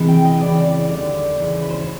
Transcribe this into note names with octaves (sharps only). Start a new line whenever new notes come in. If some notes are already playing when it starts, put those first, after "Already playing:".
Already playing: C3 E3 G#3
G5
D#5
C#3 E3 G#3 D5
D5
D#2 D3 G3
D#2 C#3 E3
B4
C5
C#5